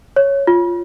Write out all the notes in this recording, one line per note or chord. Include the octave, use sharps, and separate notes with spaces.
C#5
F4